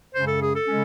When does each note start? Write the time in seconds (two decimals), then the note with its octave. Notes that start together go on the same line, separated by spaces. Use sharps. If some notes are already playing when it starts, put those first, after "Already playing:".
0.14 F#2 C#3 G#3 C#4 C5
0.28 A4
0.43 G#4
0.56 A4
0.65 C#3 G#3 C#4